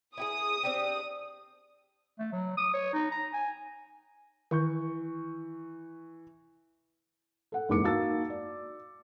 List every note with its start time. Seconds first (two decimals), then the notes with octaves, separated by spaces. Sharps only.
0.17 E4 G4 G#4 D#6
0.63 C4 D4 G4
2.19 A3
2.32 F#3
2.57 D#6
2.74 C#5
2.93 D#4
3.11 A#5
3.33 G#5
4.51 D#3 E3 C#6 G6
7.52 A4 F#5
7.69 F#1 E2 G#2 D6 C#7
7.84 A#3 D#4 F#4 A5 E6 A6
8.30 D5